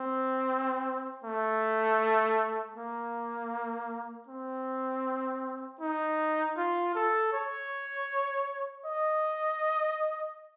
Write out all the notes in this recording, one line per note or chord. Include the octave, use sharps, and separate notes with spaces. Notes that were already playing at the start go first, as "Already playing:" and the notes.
Already playing: C4
A3
A#3
C4
D#4
F4
A4
C#5
D#5